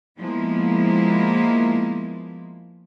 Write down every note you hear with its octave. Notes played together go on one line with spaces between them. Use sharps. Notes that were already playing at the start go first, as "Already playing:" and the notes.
F3 G#3 A#3 B3 E4